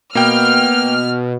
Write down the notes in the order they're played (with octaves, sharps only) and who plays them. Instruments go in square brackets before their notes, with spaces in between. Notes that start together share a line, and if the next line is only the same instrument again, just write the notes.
[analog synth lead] B2 [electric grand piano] A#3 G5 [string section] F6